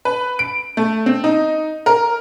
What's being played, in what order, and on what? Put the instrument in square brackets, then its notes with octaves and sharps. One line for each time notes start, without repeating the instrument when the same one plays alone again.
[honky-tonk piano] B4
D7
A3
C4
D#4
A#4